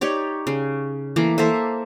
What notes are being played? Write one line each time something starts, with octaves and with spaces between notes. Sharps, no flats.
D#4 G4 C#5 D5
C#3
E3 A3 A#3 D6
A#3 A4 C5 E5